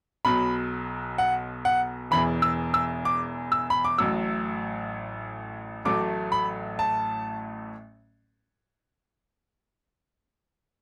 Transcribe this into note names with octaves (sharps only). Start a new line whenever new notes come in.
B1 B2 F#3 B5
F#5
F#5
E1 E2 E3 B5
E6
E6
D6
E6
B5
D6
A1 A2 F#3 E6
A1 A2 F#3 A3 D6
B5
A5